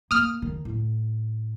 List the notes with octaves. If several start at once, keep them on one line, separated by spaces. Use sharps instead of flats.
A#3 D#6 F6
D#3
A2